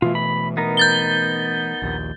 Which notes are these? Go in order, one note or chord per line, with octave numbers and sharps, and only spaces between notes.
B2 E3 A3 F4
B5
B3 D#4 A#4
G6 A6 G7
A#1 D#2